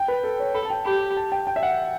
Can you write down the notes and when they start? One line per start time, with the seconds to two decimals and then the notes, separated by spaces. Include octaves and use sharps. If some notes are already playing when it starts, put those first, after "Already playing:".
Already playing: G5
0.08 B4
0.24 A4
0.39 C#5
0.54 A4 B5
0.65 A5
0.70 G5
0.85 G4 B5
1.17 A5
1.32 G5
1.47 G5
1.56 E5
1.63 F#5